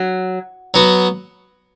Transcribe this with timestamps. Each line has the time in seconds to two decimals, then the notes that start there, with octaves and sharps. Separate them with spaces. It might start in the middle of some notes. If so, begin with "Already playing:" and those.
Already playing: F#3
0.74 F#3 B3 F#4